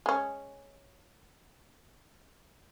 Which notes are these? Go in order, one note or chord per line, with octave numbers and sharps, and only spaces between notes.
G#3 C#4